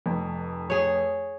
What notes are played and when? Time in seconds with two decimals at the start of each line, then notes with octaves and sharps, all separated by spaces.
0.06 F1 F2
0.70 G#4 C#5